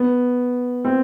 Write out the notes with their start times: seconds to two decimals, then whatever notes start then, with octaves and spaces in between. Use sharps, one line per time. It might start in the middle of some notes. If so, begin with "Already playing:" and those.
Already playing: B3
0.85 C4